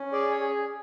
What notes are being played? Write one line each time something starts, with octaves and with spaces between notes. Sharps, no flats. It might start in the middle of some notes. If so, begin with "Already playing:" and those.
Already playing: C#4
G#4 D5
C#5
G#4